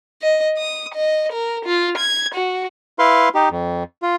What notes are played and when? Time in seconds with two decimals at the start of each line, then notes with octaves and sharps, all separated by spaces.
0.22 D#5
0.57 D#6
0.94 D#5
1.32 A#4
1.65 F4
1.98 G#6
2.34 F#4
2.99 E4 B4 F5 C6
3.35 D#4 G4
3.51 F2
4.02 F4